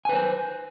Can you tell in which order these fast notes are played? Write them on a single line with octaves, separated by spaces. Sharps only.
G#5 B4 C5